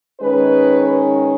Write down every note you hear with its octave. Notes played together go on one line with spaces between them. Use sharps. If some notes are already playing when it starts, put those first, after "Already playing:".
D#3 G#3 C#4 B4